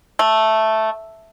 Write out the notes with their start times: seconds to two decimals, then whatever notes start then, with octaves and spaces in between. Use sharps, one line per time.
0.19 A3